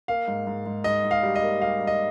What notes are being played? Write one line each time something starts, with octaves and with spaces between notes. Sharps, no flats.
A#3 F5
G#2
G#2
G#2
G#2 D#5
G#2
F5
G3
D#5
A#3
G3 F5
G3
D#5